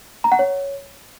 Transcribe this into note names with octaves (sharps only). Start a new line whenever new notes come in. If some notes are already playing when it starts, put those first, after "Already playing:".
A#5
F#5
C#5